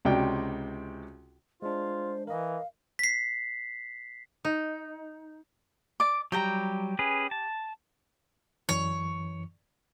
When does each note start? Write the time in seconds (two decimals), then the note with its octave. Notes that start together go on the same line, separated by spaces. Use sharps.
0.05 C#2 C3 F#4 D5 G5
1.62 G#3 D4 F4 C5
2.27 E3 A#4 D#5 F5
2.99 B6 C7
4.45 D#4
6.00 D5 D6
6.32 F#3 G3 G4 G5 A#5
6.99 C#4 G#4 B4
7.31 A5
8.69 F#2 E3 C#5